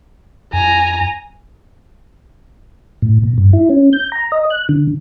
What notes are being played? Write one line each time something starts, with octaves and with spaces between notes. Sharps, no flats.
F2 G#5 A#5
A2
A#2
G2
E4
C#4
G6
A#5
D#5
F#6
D3